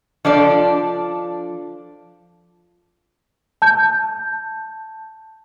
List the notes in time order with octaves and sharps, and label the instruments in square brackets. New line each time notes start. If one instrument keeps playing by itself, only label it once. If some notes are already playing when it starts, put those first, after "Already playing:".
[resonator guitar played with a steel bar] F3 D4 A4 D5
[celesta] A5 G6